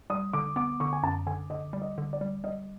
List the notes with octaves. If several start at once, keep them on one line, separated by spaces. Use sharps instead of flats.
G3 D#6
D3 D6
B3 D6
D3 C#6
G#5
F#2 A5
D3 G#5
D3 D#5
G3
D#5
D3
D5
G3
G3 D#5